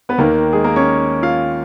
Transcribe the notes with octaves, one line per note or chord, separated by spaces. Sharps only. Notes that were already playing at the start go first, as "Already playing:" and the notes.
B3 B4
D#2 D#3 A#3 A#4
G#3 G#4
A#3 A#4
C#4 C#5
F4 F5